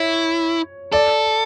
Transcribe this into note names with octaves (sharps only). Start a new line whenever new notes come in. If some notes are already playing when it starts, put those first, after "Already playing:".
Already playing: E4 C#5
A4 D5